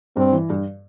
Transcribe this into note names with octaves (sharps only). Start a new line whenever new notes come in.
G2 C4
E3
G2